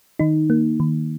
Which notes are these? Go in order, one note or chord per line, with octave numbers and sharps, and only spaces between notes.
D#3 D#4
A#3
D#3